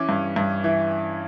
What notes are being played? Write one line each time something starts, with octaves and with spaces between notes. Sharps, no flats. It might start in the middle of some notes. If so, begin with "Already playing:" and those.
Already playing: E3 C#4 D6
G2
G2
E3